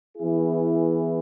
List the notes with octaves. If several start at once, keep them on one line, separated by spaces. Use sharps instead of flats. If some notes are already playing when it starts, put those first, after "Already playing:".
E3 B3 E4 G#4